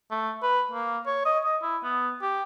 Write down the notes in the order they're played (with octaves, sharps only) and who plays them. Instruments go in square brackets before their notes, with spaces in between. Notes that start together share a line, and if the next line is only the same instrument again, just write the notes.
[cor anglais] A3
B4
A#3
C#5
D#5
D#5
E4
B3
G4